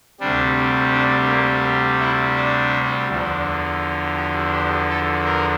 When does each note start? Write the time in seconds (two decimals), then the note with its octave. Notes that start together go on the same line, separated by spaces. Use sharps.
0.20 D2 C3 G3 D4
0.92 D4
1.28 A#3
2.00 E4
2.36 D4
3.09 E2 D3 F3
4.16 G4
4.52 G4
4.88 A4
5.24 A#4